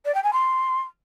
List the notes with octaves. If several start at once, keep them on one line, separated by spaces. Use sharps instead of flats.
D5
G5
G#5
C6